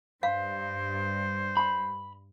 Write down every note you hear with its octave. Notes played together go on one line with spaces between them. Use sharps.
G2 C5 F5
B5